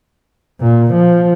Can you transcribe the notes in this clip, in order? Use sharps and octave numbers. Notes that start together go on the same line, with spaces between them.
A#2
F3